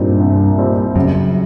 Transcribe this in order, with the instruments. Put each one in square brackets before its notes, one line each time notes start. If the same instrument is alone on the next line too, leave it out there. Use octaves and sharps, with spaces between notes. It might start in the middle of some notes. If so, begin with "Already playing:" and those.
Already playing: [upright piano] C2 A#2 G3 C4 D#4 [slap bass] G2
[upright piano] C2
A#2 G3 C4 D#4
[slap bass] F#2 [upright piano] C#3